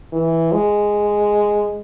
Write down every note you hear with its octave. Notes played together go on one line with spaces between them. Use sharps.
E3
G#3